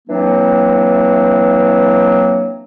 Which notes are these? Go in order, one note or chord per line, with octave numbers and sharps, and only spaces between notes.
E3 F#3 A#3 C4 D4